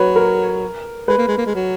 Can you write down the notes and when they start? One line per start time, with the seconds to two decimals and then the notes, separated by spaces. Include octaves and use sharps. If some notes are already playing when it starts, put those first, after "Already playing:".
Already playing: F#3 F#4 B4 C#5
0.16 A#4
1.08 G#3 B4
1.18 A#3
1.28 G#3
1.38 A#3
1.46 G#3
1.55 F#3